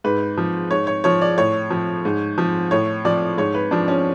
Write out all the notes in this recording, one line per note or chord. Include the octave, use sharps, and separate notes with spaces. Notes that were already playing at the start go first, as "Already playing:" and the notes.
G#2 B4
F3
G#2 C#5
C#5
F3 C#5
D5
A2 C#5
F3
G#2
F3
A2 C#5
F3 D5
G#2 C#5
B4
F3 D4
C#4